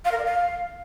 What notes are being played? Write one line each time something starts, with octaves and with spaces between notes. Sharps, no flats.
F5
A#4
D5
F5